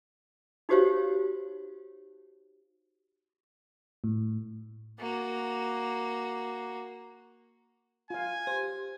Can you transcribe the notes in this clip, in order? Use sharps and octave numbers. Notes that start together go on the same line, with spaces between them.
D#4 F#4 G4 C5 C#5 F5
A2
A#3 F#4
F4 F5 G#5
G4 C5